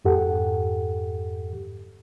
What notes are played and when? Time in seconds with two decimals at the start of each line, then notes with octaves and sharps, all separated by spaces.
0.05 F2 G#2 G4 A4 F#5